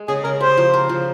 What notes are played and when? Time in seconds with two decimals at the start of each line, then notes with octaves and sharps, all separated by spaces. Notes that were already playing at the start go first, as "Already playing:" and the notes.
Already playing: G#3
0.08 C#3 G#4
0.24 C#3 A#4
0.40 G4 C5
0.57 F3
0.74 A#4
0.89 F3